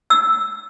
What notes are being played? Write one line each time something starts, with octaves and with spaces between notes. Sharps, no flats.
E6